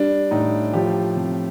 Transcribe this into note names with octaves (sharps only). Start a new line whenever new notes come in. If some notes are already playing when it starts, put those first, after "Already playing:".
Already playing: G3 D4
A2 D#4
F3 G4
C3